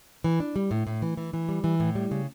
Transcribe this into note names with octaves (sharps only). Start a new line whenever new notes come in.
E3
D4
G3
A2
A2
E3
E3
E3
G3
E3
A2
G3
C#3